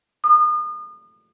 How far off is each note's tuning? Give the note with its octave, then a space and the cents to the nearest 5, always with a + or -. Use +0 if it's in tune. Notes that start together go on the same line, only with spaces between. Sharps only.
D#6 -35